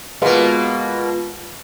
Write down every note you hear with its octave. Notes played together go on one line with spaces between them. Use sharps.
B2 G#3 A#3 B3 F4